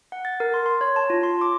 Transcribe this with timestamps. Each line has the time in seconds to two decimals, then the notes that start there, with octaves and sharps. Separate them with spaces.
0.12 F#5
0.25 A6
0.40 A#4
0.54 C6
0.66 C6
0.81 C#5
0.96 A5
1.10 F4
1.23 C6
1.41 D6